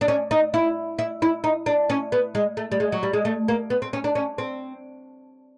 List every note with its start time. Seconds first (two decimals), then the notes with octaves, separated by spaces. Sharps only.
0.01 D4
0.08 C#4
0.31 D#4
0.54 E4
0.99 E4
1.22 E4
1.44 D#4
1.66 D4
1.90 C#4
2.12 B3
2.35 G#3
2.57 A3
2.72 G3
2.80 G#3
2.92 F#3
3.03 G3
3.13 G#3
3.25 A3
3.48 A#3
3.70 B3
3.82 C4
3.93 C#4
4.04 D4
4.15 C#4
4.38 C4